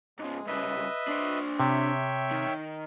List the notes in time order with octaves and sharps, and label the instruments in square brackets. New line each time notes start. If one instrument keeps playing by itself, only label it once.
[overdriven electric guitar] G#2 C#3 [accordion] G#3
[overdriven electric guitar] C2 C#3 [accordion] B4 D#5 E5
[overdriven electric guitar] D4 C5
[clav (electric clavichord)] C3 [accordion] C#5 E5 G5
[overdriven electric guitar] D#3